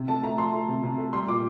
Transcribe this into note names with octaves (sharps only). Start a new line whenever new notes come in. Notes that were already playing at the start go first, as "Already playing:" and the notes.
Already playing: C3
A3 A5
A3 A#5
F3 C6
A3
C3
C3
A3
G3 C6
A#2 D6